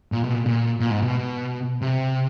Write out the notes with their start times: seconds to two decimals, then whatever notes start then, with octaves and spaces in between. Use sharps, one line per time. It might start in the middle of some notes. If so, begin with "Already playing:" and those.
0.12 A#2
0.24 B2
0.35 A#2
0.46 A#2
0.80 A#2
0.91 G#2
1.02 B2
1.82 C3